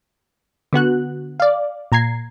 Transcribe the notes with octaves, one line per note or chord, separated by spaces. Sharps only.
D3 B3 F#4 F#6
D5 F5
A#2 A#5 G#6 C7